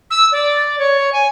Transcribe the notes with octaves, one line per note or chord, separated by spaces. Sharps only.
E6
D5
C#5
G#5